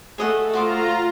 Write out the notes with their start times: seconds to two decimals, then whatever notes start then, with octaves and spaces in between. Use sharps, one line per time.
0.18 A3 G#4 D#5 F#5
0.54 F4 F#4 C5 A#5 D6